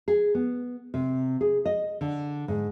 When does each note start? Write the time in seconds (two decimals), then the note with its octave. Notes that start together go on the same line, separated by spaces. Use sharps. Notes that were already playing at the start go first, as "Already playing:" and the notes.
0.08 G#4
0.35 B3
0.94 C3
1.41 G#4
1.65 D#5
2.01 D3
2.48 G#2